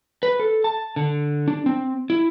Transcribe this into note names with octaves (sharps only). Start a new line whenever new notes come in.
B4
A4
A5
D3
D4
C4
E4